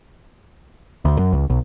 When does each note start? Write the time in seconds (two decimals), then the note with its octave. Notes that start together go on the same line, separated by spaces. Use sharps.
1.05 D2
1.19 F#2
1.33 C#2
1.50 B1